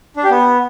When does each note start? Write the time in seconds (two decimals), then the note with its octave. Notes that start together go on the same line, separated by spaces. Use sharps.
0.17 D4
0.24 G4
0.30 B3